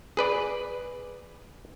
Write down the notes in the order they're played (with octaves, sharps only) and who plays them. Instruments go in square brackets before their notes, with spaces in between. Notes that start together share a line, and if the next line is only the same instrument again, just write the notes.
[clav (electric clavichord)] G#4 B4 D5